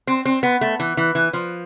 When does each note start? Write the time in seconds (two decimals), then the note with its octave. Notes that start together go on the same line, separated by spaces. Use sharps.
0.07 C4
0.25 C4
0.43 B3
0.61 A3
0.80 E3
0.97 E3
1.15 E3
1.33 F3